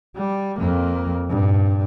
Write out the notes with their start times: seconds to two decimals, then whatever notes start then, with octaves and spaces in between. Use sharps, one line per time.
0.16 G3
0.59 F2 A#3
1.30 G2 A#2